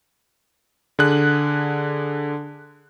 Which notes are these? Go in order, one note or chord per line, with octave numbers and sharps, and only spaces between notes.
D3 G#4 F#6